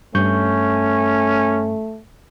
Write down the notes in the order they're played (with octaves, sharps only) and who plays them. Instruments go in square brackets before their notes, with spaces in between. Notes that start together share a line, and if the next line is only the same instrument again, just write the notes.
[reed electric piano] G2 C#6 G6 [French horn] A3 [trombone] C#4